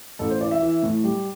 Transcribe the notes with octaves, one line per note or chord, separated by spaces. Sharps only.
A1 A4
C5
E3 D5
E5
E3
A2
G3